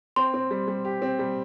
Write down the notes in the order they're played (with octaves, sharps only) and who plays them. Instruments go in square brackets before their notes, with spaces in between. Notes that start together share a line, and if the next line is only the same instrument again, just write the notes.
[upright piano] C4 [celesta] C6
[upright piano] C4
G3
G3
G4
C4
G3